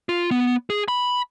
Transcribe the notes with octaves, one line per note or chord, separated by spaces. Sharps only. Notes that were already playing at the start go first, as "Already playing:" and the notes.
F4
B3
G#4
B5